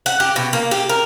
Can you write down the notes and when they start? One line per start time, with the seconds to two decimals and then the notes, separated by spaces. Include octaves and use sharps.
0.06 F#5
0.20 G4
0.36 B2
0.53 A#3
0.71 G4
0.89 A#4